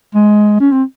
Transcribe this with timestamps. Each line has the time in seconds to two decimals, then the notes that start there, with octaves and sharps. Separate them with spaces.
0.14 G#3
0.60 C#4
0.72 C4